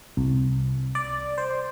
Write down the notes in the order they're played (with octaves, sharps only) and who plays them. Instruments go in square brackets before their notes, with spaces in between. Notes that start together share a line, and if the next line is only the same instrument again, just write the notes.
[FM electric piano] C2
D5
C5